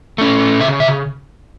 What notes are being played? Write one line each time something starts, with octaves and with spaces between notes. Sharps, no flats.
A3 C#4
C#3 E5
E5